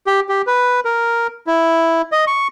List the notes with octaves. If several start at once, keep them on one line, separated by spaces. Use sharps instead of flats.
G4
G4
B4
A#4
E4
D#5
C#6